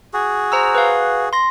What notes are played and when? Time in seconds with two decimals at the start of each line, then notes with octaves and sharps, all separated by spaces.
0.13 F#4 G#4
0.52 C5 A#5 E6
0.75 B4 F5
1.33 C6 A#6